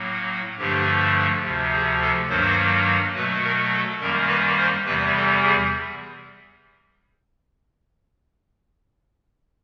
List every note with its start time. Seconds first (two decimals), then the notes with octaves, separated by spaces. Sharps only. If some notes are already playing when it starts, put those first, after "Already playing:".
Already playing: A2 F#3 A#3
0.58 G2 D3 F3 A3 G4
1.44 D2 C3 F3
1.73 G#4
2.01 A4
2.29 G2 D#3 F#3 A#3 C5
3.16 B2 F#3 A3 B4
3.43 A#4
3.72 A4
4.01 F#2 D#3 G3 A#3 A#4
4.29 B4
4.58 C5
4.86 E2 C3 E3 G3 B4
5.15 A4
5.43 G#4